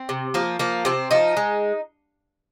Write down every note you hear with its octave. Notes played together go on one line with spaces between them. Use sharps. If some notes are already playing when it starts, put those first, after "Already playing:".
Already playing: C4
C3
F3 A#3
F3 A#3
C3 C4
F3 D#4
G#3